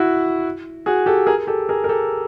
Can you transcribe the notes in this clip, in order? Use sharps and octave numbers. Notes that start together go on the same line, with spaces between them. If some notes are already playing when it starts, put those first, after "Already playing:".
Already playing: E4 F#4
F#4 G#4
G4 A4
G#4 A#4
G4 A4
G#4 A#4
A#4
G4 A4